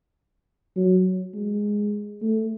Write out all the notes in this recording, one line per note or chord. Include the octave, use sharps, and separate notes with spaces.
F#3
G#3
A3